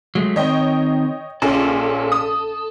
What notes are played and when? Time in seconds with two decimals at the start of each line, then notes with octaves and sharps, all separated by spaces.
0.15 F#3 G#3 A3
0.36 D#3 C4 C#5 D#5 G5
1.42 A#1 A#2 C#4 A4
2.12 D#6